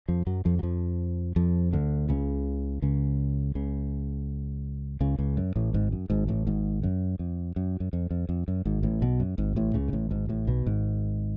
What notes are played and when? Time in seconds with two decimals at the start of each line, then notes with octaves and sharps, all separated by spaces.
0.08 F2 F3
0.27 F#2 F#3
0.45 F2 F3
0.59 F#3
0.63 F2 F3
1.36 F2 F3
1.73 D2 D3
2.09 C#2 C#3
2.82 C#2 C#3
3.55 C#2 C#3
5.01 C#2 C#3
5.18 C#2 C#3
5.37 F#2
5.56 A1 A2
5.74 G#1 G#2
5.92 F#2
6.10 G#1 G#2
6.28 A1 A2
6.47 G#1 G#2
6.83 F#2
7.19 F2
7.56 F#2
7.80 F#2
7.93 F2
8.11 F2
8.29 F2
8.48 F#2
8.65 G#1 G#2
8.83 A1 A2
9.02 B1 B2
9.20 F#2
9.38 G#1 G#2
9.56 A1 A2
9.74 C#2 C#3
9.88 G#2
9.93 A1 A2
10.10 G#1 G#2
10.29 A1 A2
10.47 B1 B2
10.66 G#1 G#2